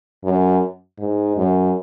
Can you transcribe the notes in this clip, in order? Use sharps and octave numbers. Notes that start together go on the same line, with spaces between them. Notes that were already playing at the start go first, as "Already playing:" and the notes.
F#2
G#2
F#2